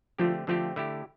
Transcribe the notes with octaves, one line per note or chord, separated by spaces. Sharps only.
D3 F3 A3 C4 G4
D3 F3 A3 C4 G4
D3 A3 E4 G4